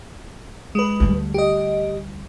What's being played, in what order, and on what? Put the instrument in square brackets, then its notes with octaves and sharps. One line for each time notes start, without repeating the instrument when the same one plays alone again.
[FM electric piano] G#3 B4
[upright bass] D2 G3
[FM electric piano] G4 D#5